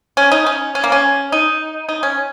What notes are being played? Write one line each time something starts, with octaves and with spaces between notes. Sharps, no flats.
C#4
D#4
C#4
C#4
A#3
C#4
D#4
D#4
C#4